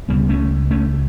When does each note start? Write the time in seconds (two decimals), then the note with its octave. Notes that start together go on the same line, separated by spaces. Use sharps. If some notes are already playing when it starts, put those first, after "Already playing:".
0.09 C#2 C#3 G3 B3
0.29 A3 C#4
0.71 A3 C#4